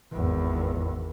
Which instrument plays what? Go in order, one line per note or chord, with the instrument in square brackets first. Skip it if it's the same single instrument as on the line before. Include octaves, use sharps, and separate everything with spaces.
[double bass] G#1 E2